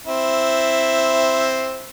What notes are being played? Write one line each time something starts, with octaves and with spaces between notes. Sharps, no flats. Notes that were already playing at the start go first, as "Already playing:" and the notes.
C4 E4